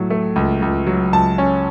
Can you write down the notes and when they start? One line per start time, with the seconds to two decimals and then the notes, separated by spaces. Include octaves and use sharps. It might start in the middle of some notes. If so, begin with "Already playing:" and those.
Already playing: A2 F#3 A3
0.10 A3
0.36 C#2
0.62 C#2
0.87 F#3
1.13 C#2 A5
1.38 C#4